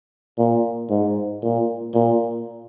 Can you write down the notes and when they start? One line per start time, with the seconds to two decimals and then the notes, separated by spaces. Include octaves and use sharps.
0.38 A#2
0.90 G#2
1.42 A#2
1.94 A#2